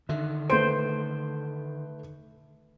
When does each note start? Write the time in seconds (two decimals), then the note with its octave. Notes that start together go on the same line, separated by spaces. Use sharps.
0.09 D3 D#3 E5
0.50 A3 B4 C5 D7